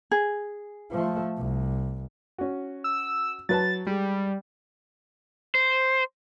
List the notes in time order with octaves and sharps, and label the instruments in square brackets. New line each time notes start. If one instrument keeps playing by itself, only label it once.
[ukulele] G#4
[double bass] F3 A3
C2
[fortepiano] C#4 F#4
[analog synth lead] E6
[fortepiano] F#3 B4 A5 [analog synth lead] A6
[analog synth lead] G3 [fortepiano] G#3
[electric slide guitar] C5